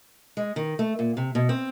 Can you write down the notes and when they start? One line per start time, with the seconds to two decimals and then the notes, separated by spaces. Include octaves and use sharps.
0.37 G#3
0.56 D#3
0.79 A3
0.99 A#2
1.17 C3
1.35 B2
1.49 C4